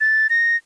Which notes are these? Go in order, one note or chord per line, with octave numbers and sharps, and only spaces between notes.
A6
A#6